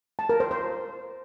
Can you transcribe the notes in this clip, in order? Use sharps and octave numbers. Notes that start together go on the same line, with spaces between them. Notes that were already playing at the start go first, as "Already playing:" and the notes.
A5
A#4
C5
C5